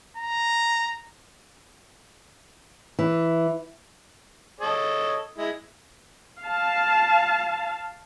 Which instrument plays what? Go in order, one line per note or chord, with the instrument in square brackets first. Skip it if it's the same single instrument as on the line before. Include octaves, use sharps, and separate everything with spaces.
[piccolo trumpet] A#5
[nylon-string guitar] E3
[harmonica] A4 C#5 D#5
G#3 E4
[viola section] F5 A5